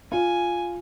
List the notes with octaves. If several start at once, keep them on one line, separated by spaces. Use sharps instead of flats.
F4 G#5